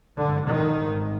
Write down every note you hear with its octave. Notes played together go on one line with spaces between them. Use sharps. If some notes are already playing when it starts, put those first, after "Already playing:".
G#1 G2 D3
D#3
G#1 G#2